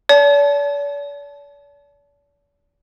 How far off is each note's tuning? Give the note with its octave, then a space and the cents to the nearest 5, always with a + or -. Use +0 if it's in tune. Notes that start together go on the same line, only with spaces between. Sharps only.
D5 -45 A5 -15